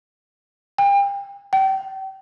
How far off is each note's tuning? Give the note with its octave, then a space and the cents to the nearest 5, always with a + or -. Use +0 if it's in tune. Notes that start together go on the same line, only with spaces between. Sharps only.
G5 +35
G5 -30